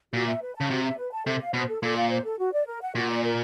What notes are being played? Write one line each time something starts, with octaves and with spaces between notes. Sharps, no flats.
A#2 F#4
E5
B4
A5
C#3
C3 F#4
E5
B4
A5
C3 A4
F5
B2 C5
A4
A#2 A4
F5
C5
A4
F#4
D5
A#4
F#5
A#2 F#4
D5
A#4